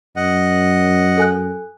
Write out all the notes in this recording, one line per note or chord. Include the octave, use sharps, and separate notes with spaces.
F#2 D#5 F#5
A4 G#5 F#6